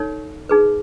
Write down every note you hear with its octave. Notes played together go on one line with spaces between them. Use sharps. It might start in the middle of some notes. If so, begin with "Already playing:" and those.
Already playing: D#4 A4 C#5
D#4 G#4 B4